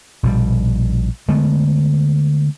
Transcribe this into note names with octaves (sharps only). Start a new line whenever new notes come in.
A#1 B2 G3
D3 G#3 A3 B3